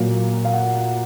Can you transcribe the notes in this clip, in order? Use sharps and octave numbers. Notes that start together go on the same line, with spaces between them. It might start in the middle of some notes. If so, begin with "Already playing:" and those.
Already playing: A#2 F#3 A#3 F5
F5
F#5